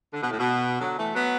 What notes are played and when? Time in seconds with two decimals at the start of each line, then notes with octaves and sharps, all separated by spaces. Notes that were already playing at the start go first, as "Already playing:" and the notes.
0.13 D3
0.21 B2
0.30 A2
0.38 B2
0.80 D3 F#3
0.97 E3 A3
1.14 F#3 B3